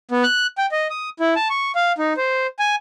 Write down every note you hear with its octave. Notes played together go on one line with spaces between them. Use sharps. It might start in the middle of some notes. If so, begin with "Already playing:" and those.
B3
F#6
G5
D#5
D#6
E4
A5
C#6
F5
D#4
C5
G#5